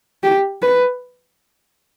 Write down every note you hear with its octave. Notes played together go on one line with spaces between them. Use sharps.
G4
B4